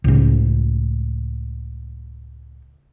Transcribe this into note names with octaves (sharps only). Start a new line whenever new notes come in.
C#2 A2 C#3